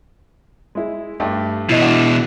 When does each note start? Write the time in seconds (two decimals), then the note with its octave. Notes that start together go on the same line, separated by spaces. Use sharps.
0.75 G#3 E4
1.20 G2 A3 G4
1.69 B2 E3 E4 D#5
1.82 D4 F#4 D5